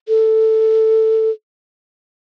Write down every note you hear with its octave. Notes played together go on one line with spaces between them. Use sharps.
A4